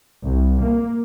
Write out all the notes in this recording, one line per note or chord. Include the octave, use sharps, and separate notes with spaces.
C2
A#3